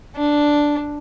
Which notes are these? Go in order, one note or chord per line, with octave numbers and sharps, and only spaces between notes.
D4